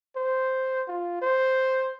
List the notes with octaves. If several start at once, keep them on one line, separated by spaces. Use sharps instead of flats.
C5
F4
C5